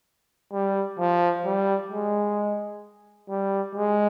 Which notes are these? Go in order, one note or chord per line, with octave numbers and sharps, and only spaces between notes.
G3
F3
G3
G#3
G3
G#3